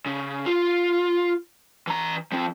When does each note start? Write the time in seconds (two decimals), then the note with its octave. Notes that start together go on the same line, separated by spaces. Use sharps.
0.06 C#3
0.46 F4
1.87 E3 A#5
2.32 F3 C4